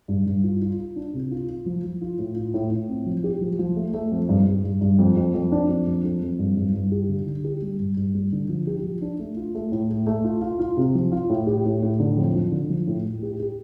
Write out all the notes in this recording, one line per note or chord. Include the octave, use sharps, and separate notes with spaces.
G2
G2
F4
F4
F4
D4
C3
F4
F4
F3
F3
F4
A2
F4
A2
A2
C4
F3
G4
F3
F3
A3
A3
F2
G2
G2
G2
G2
F2
F2
F2
D4
F2
F2
F2
F2
G2
G2
G2
G4
D3
D3
G4
G3
G2
G2
G3
D3
F3
G4
F3
D4
A3
F4
A3
A2
A3
A3
F4
F4
F4
C3
F3
F4
A2
G4
A2
A2
D3
F2
F3
D3
F3
A2
A2
G4
G4